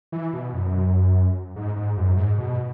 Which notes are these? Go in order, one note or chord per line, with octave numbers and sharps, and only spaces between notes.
E3
B2
F#2
G#2
G#2
F#2
G#2
B2